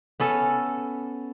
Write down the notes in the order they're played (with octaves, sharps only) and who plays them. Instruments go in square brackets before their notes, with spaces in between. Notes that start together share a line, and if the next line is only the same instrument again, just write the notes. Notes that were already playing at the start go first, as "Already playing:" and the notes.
[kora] B3 C#4 A4